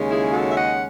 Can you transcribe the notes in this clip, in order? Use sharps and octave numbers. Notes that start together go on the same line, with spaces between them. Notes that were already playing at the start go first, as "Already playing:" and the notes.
Already playing: D#2 C#3 G#3 C#4
E4 G#4
F#4 A4
E5
D#5 F#5